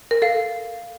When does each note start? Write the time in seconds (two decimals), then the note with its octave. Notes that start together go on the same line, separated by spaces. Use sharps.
0.11 A#4
0.22 A4 F5